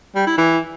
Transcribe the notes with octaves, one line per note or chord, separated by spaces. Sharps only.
G3
E4
E3